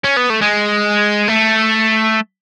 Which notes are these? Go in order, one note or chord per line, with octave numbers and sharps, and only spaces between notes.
C#4
B3
A3
G#3
A3